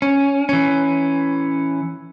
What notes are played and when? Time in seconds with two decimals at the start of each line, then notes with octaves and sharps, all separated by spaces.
0.02 C#4
0.49 E3 C#4